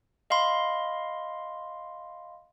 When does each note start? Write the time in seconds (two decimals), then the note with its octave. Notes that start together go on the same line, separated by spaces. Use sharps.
0.30 D#5 F5 B5 C6